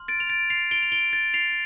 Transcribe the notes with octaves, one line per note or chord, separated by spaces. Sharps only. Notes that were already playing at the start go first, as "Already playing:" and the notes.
Already playing: C6 F6
A6 D7
F7
A6 D7
C7 F7
D7 G7
F7
D7 G7
A6
C7 F7